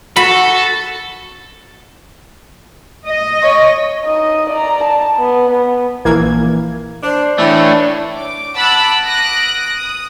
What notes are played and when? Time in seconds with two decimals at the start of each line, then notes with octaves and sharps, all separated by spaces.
0.16 F#4 A4 B5
3.06 D#5
3.43 C#5
4.05 D#4 D#5
4.50 D5 A#5
4.84 A5
5.18 B3
5.50 B3
6.05 A#1 E3 A#3 G#6
7.03 D4 C5
7.38 A2 E3 A3 D4 C#5 B5
8.14 D6
8.56 F#5 A5 B5 D6 E6 F#6
9.04 D#6 F#6 A#6 D7
9.73 D#6